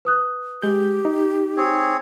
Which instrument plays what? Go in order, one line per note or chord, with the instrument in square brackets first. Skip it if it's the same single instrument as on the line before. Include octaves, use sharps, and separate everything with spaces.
[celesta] B4 D#6 F#6
[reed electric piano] G#3 G6 [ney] G4
[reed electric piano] D#4
[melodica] C4 G#4 C#5